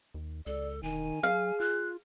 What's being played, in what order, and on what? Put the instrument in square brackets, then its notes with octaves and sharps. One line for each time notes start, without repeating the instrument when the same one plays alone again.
[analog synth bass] D#2
[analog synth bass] C#2 [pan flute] A4 [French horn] D5
[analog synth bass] E1 [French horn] D#3 [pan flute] G#5
[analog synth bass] F#3 [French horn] G#4 [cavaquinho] F5
[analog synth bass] F4 [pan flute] F#6